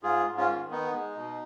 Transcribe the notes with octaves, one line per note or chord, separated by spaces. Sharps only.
G#2 F4 G#4
G#2
C#4 F4
D#3
B3 D#4
G#3
B2